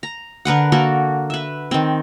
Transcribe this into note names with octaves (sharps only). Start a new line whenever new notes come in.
A#5
D3 A#4 B4 F#5
A#3 F#4 A4 A#4
B4 E5
D#3 C4